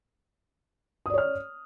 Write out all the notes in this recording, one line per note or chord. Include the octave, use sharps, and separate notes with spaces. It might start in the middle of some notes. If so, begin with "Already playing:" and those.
C#5 D5 D#6 F6